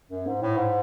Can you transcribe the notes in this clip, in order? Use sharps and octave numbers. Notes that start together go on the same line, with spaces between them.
F#2
G#2
A2
G#2